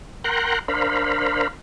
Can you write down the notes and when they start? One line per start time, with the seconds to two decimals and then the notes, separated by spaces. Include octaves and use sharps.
0.24 A#4 F#5 G5 A#5 C6 F#6
0.68 D4 A#4 C5 F5 B5